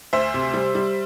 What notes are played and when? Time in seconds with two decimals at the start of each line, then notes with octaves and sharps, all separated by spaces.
0.13 D2 C5 E5
0.34 C3
0.54 G3
0.75 G3